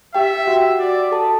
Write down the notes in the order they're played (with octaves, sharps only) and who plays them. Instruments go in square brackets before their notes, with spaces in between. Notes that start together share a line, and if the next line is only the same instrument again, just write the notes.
[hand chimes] G4 G5 [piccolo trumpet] E5
[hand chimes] F#4 F#5
[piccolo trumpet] D5
[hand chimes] A4 A5